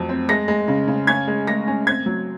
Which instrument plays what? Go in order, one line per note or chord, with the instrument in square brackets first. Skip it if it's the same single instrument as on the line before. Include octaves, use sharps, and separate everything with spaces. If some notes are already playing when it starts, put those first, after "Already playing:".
Already playing: [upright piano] F2 F#3
C4
G#3 A#6
G#3
C#3
C#3
C#4 G#6
G#3
G#3 A#6
C#4
C4 G#6
F#3